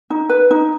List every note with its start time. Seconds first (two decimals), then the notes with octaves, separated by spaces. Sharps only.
0.10 D#4
0.29 B4
0.51 D#4